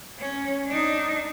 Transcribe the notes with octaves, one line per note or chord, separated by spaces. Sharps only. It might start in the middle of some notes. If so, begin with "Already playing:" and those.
C#4
D4 D#4